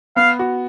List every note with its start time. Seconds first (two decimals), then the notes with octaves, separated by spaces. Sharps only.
0.16 B3 F5
0.39 F#4